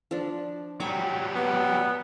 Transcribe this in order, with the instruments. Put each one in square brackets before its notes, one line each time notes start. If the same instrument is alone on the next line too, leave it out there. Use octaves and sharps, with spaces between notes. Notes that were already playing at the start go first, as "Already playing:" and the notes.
[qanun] F3 D4
[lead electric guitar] F#3 G3 [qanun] G5 G#5 D6
[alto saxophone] B3